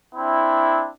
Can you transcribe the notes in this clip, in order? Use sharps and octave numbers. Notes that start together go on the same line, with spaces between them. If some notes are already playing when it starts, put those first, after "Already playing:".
C4 D4 E4